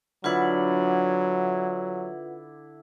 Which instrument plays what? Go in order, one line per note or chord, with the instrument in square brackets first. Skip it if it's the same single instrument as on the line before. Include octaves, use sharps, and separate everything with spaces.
[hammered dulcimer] D3 E4 D5 [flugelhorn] F#3 [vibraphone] F4 B4 F#5